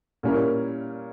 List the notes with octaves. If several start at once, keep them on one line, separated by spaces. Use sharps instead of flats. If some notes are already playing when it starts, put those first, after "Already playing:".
A#2 G3 C#4 E4 A#4